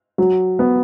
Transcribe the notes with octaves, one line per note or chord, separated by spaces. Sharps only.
F#3
B3